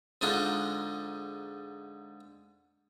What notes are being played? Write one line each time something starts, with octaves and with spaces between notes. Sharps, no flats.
G#2 D3 D4 D#4 F4